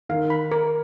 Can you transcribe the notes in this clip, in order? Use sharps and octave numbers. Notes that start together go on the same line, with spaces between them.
D#3 F5
B5
A#4